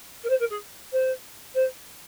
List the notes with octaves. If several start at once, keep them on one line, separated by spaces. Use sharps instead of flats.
A#4
C5
A#4
G#4
C5
C5